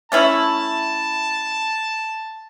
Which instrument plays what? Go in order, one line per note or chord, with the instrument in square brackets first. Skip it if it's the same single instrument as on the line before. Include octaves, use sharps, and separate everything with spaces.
[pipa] A3 C#4 E4 [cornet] A5